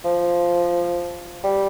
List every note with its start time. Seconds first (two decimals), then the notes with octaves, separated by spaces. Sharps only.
0.05 F3
1.44 G3